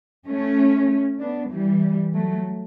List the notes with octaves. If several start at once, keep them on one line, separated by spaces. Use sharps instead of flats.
A3 C#4
B3 D4
E3 G3
F#3 A3